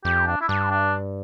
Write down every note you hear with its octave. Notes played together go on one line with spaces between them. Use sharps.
F2 G4
D4
E4
G2 D4
D4